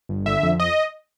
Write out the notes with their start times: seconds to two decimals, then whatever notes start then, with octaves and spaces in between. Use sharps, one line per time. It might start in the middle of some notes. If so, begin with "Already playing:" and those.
0.09 G1
0.26 D3 E5
0.43 F2
0.60 D#5